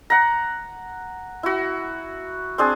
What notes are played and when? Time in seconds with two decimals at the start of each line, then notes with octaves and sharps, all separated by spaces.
0.10 F#5 A#5
1.43 E4 F#4
2.58 C4 D4 G#4